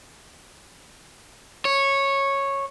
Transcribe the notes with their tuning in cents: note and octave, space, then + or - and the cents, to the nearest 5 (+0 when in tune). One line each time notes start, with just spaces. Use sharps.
C#5 -10